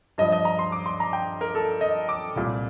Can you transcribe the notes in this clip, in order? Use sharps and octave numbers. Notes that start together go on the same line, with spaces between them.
G2 F3 D#5
D#5
A#5
C6
D6
C6
A#5
G5
A#4
A4
D#5
D6
C2 A#2 G3